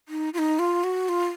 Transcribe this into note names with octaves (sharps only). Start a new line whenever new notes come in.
D#4
F4
D#4
F4
F#4
F4